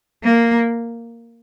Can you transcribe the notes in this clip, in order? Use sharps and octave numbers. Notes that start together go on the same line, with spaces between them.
A#3